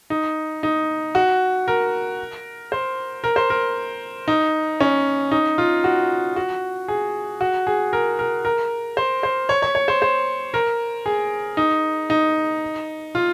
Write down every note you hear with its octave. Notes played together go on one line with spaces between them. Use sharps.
D#4
D#4
F#4
A#4
C5
A#4
C5
A#4
D#4
C#4
D#4
F4
F#4
F#4
G#4
F#4
G#4
A#4
A#4
A#4
C5
C5
C#5
C#5
C#5
C5
C5
A#4
G#4
D#4
D#4
F4